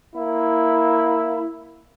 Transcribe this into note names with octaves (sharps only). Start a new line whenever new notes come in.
A#3 E4